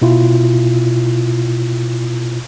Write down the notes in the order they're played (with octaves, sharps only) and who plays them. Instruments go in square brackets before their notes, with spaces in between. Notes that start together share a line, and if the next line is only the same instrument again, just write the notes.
[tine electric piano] B2 E4 F4